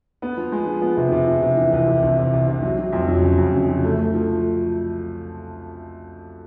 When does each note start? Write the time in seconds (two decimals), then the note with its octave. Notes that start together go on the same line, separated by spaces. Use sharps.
0.22 B3
0.37 F3
0.52 G#3
0.67 F3
0.82 B3
0.97 C3
1.12 C3
1.28 F3
1.42 C3
1.57 E3
1.72 C2
1.87 C3
2.02 C2
2.18 C3
2.33 C2
2.48 C3
2.62 F#3
2.79 F#3
2.93 F2
3.08 F#3
3.24 C#3
3.38 F2
3.54 C#3
3.69 F#3
3.84 A3
3.99 A3
4.14 F3